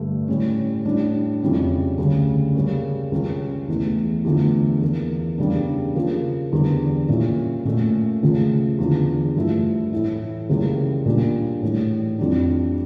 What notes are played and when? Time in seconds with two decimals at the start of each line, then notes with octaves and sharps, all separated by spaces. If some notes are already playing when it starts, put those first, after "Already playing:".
Already playing: G2 D3 A3
0.28 A2 G3 C#4
0.85 A2 G3 D4
1.42 F2 C#3 G3 C#4 E4
1.98 D2 C#3 G3
2.54 C#3 G3 A#3 C#4
3.11 C#2 C#3 G3 C#4
3.68 E2 E3 A3
4.25 E2 D3 F3 A3
4.82 E2 E3 A#3
5.38 E2 C#3 G3 D4
5.95 C#3 F3 A#3
6.52 E2 D3 G3
7.08 A#2 G3 C#4 E4
7.65 A#2 A3 C#4
8.22 C#2 C#3 F3 A3
8.78 E2 D3 F3
9.36 G2 F3 A3 E4
9.93 A2 E3 A3 E4
10.49 C#2 C#3 E3 G3 A#3
11.06 A#2 G3 D4
11.62 A2 E3 G3
12.19 F2 E3 G3 D4